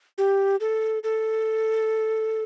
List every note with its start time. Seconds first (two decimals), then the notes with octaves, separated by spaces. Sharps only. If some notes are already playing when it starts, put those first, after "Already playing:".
0.18 G4
0.60 A4
1.04 A4